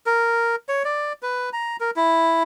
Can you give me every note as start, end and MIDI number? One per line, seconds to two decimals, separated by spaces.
0.06 0.56 70
0.69 0.83 73
0.85 1.13 74
1.23 1.49 71
1.53 1.77 82
1.80 1.91 70
1.96 2.43 64